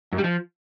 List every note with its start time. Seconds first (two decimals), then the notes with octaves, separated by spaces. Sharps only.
0.12 F#2
0.18 G3
0.24 F3